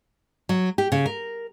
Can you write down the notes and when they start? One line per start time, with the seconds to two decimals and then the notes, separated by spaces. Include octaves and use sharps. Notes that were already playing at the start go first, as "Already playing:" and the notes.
0.49 F#3
0.78 G4
0.92 C#3
1.06 A#4